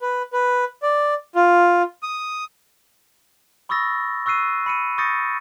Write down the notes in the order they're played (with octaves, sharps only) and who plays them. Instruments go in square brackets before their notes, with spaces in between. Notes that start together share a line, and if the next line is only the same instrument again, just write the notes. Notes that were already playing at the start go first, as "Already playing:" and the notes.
[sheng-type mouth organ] B4
B4
D5
F4
D#6
[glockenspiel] B5 C#6 D#6 E6 A6 A#6
C#6 E6 F#6 C7 D#7
B5 C#7 D#7
C#6 D#6 G6 A6 A#6 C#7